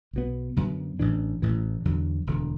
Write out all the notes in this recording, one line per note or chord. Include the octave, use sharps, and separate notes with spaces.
B1 B2 B3
F#2 D3 F#3 B3
A1 A2 E3 D4
A1 A2 E3
E2 D3 F#3
E1 D2 D3